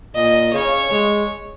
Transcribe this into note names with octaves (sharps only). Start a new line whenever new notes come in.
A#2 D#5
C#3 C#5
G#3